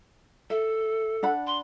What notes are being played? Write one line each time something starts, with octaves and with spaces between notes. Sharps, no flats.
A4 E5
D4 F#5 B5
C6